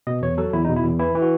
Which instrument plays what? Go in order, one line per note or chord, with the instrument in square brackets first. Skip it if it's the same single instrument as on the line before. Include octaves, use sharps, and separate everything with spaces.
[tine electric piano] B2 D#5
E2 C#5
F#3 A4
E2 E4
D#4
B2
E4
E2
E3 E4
E3
F#4